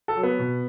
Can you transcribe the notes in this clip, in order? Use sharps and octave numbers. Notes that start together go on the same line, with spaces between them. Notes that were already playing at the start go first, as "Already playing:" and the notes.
A4
F#3
B3
B2